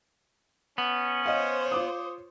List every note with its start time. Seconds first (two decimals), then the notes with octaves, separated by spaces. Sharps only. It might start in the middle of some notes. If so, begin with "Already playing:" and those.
0.78 B3 C#4
1.26 C5 C#5 D#5 F5
1.72 F4 D6 D#6